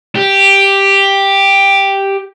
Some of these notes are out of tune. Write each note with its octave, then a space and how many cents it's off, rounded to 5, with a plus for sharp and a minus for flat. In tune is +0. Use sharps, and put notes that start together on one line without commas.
G4 +5